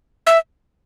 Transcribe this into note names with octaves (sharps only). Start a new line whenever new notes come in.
E5